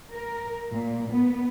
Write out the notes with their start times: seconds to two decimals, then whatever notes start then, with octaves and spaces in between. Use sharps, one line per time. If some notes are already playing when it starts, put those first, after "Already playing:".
0.12 A#4
0.72 A#2
1.10 B3